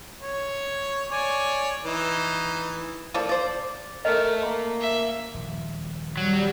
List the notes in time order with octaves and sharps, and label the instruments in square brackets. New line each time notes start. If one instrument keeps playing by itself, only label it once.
[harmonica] C#5
C#5 D5 G#5
E3 D#4
[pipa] F3 A#3 A4 D5
C5 D5
[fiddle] A3 [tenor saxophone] A#4 [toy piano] D#5
[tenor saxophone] A#3 [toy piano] A#5
[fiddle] E5
[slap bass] D#1 F3
[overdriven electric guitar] F#3 [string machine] G3